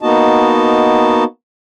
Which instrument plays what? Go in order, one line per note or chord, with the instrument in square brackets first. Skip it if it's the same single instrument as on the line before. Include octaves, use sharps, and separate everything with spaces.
[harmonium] A#3 B3 D#4 F#4 D#5 A5